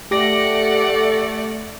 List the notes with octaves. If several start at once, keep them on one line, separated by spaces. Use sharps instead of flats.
A3 G4 D5 F#5 D6 A#6